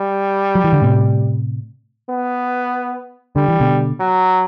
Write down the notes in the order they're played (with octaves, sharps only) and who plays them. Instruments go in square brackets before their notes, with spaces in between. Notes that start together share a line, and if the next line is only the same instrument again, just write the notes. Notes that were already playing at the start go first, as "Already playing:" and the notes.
Already playing: [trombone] G3
[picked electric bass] F#3
E3
D3
A2 C3
[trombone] B3
[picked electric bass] D3 [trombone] G3
[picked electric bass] E3
B2 D3
[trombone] F#3